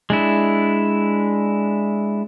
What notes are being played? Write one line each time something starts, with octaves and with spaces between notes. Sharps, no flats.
G#3 D4 E4